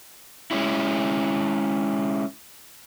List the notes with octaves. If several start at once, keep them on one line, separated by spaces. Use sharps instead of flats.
G#3 C#4 E4